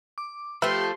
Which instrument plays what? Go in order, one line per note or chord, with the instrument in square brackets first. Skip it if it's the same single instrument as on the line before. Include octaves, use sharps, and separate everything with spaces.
[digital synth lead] D6
[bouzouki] F3 A3 [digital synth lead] G4 [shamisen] B4 E5 [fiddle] C6